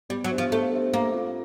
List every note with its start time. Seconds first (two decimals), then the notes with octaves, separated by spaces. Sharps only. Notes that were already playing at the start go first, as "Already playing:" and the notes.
0.10 G3 B3
0.24 F#3
0.31 D4 G4 C5 E5
0.38 F3
0.52 A3 B3
0.73 D4 G4 C5 E5
0.94 A3 A#3
1.14 C4 F4 A4